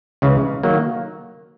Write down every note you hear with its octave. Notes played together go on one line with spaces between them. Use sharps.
C#2 C#3 E3
D#3 F#3 A#3